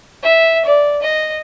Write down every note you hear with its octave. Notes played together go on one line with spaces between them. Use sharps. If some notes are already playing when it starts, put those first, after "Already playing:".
E5
D5
D#5